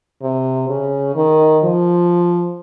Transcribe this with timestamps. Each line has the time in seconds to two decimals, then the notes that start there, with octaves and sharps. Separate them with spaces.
0.22 C3
0.69 C#3
1.16 D#3
1.63 F3